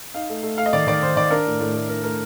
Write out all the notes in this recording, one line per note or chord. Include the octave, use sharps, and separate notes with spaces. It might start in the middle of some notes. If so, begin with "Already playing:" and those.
D#4 F5
A3
A3
A3 F5
D#5
D#3 D5
D#3 D5
D#3 C5
D#3 D5
D4 A#4
A2
A2
A3
D4 A#4
A3 A#4